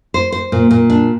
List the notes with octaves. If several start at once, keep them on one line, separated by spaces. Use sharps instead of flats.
C5
C5
A#2
A#2
D4